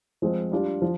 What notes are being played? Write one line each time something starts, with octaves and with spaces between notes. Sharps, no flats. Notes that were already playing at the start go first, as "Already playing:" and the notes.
F3 G#3 C4
G3 D4 F4
F3